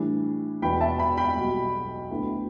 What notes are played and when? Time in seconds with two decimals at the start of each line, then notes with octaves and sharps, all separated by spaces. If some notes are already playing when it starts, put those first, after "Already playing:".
Already playing: A2 E3 G3 D4
0.62 E1 E2 B2 B3 G5 B5
0.81 E5 A5
0.99 G5 B5
1.17 G5 B5
1.36 B1 B2 G3
2.11 D2 D3 B3 E4